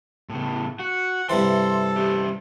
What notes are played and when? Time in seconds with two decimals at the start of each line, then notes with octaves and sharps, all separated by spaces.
0.29 A2 C#3
0.79 F#4 F#5
1.29 G2 C3 E3 A4 C6
1.97 C#4 G4